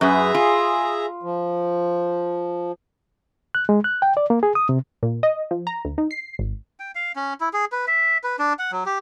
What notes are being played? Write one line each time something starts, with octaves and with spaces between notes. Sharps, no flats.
F#2 G#4 B4 E5 A#5
F4
F3
F#6
G#3
F#6
G5
D5
A#3
G#4
D#6
C3
A#2
D#5
F3
A#5
D2
D#4
C7
G#1
G5
F5
C#4
E4
G#4
B4
E5
B4
D4
F#5
F#3
G4